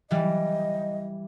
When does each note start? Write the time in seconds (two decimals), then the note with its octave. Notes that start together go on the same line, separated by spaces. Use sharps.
0.11 E3 G3 D#5